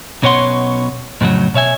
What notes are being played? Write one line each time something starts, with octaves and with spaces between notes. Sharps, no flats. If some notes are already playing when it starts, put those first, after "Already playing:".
B1 B2 C#4 C#5 F#5 C6
F2 A2 C#3 F3 F#3
B2 C#5 E5 G#5